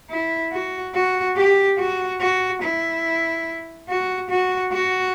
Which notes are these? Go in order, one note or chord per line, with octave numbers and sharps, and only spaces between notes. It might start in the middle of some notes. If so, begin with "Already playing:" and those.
E4
F#4
F#4
G4
F#4
F#4
E4
F#4
F#4
F#4